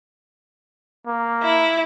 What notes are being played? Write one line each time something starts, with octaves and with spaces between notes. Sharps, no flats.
A#3
E4